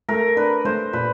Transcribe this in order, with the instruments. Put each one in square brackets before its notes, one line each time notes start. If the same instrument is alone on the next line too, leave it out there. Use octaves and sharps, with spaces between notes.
[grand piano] A3 [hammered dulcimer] A#4
[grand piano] D4 [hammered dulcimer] B4
[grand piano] A3 [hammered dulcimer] C5
[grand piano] A#2 [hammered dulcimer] B4